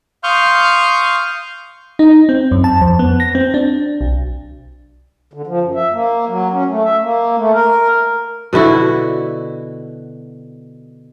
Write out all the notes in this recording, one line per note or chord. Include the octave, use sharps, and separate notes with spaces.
F5 C6 C#6 D#6 F6 G6
D#4
C4
F#2
A5
F2
B3
A#6
C4
D4
B1
D3
F3
F#2
E5
A#3
F#3
C#4
A3
E5
A#3
A3
A#4
B2 D3 E4 F#4